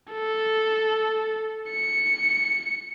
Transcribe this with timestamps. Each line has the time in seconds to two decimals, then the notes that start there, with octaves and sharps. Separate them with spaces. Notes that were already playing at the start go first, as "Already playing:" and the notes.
0.12 A4
1.70 C#7